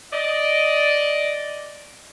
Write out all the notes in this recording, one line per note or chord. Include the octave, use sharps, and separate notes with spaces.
D5 D#5